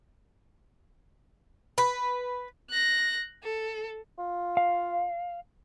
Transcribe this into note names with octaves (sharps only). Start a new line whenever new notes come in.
B4
F#6 A#6
A4
F4
F5